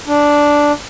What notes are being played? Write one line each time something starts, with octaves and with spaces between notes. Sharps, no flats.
D4